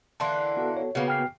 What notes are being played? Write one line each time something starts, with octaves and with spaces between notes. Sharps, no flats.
D3 E3 A#3 A5 C6
B3 F#4 A4
C#5
C#3 A#3 B3 F#4
G5 F6 C7